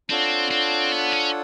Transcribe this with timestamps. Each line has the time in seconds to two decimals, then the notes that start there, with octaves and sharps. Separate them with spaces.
0.10 C4 D4 F4 A4 C#5 F#5
0.51 C4
0.92 B3
1.12 C#4